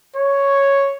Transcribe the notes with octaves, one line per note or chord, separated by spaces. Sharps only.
C#5